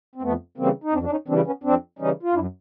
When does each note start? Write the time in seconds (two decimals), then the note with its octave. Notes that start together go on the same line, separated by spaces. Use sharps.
0.15 C4
0.22 F2 A3 B3
0.58 C#3 E3 G3 A#3 C4
0.84 D#4
0.93 F2 C4 D4
1.03 D4
1.11 C#4 D#4
1.28 C#3 E3 G3 C4 D4
1.46 B3 C#4
1.63 F2 C4 D4
1.99 C#3 E3 G3 C#4 D#4
2.23 F4
2.34 F#2 D4 E4